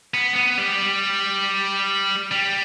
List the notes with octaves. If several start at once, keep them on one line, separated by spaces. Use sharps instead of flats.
B3
B3
G3
G3